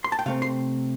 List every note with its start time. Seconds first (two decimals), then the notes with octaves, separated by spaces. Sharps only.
0.04 C6
0.12 A5
0.19 G5
0.26 C3 A3 C4 F5
0.42 C6